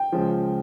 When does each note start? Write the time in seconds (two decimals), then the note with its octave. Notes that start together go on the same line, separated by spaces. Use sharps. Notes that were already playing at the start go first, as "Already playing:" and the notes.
Already playing: G5
0.12 C#2 C#3 F3